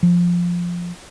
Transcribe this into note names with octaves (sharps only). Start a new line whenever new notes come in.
F3